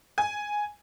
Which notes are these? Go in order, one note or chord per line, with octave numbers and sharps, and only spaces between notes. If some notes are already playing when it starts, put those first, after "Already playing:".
G#5